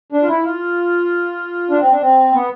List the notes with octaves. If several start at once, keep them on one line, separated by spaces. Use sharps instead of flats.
D4
F4
E4
F4
D4
C4
D4
C4
B3